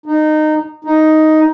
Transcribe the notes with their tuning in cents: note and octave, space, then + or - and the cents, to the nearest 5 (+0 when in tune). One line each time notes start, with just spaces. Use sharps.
D#4 -20
D#4 +5